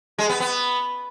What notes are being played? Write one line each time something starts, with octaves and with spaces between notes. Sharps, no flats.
G#3
B3
B3